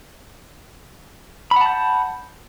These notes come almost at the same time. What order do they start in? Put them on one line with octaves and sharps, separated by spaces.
B5 F#5 A5 G6